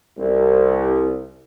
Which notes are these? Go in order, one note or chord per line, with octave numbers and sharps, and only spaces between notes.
C2